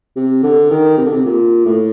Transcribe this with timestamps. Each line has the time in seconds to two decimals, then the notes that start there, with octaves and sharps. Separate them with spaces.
0.16 C3
0.43 D3
0.71 D#3
0.97 C3
1.05 D3
1.12 C3
1.25 A#2
1.65 A2